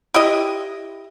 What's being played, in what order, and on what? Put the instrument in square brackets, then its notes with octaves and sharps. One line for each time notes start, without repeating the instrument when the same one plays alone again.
[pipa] E4 G4 D#5